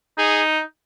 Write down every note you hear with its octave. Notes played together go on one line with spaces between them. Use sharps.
D#4 G#4